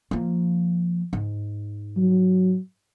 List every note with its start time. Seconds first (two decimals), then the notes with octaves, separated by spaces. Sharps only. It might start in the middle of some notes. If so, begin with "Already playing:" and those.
0.11 F3 A#3
1.13 G#2
1.97 F#3